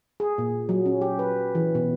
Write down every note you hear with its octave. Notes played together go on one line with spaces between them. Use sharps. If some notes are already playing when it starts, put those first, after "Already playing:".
G#4
A#2
F#3
C#4
G4
B4
E3
B2